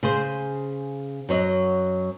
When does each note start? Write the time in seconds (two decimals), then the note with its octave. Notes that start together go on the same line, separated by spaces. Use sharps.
0.03 C#3 G#4 C5
1.29 F#2 F#3 D#5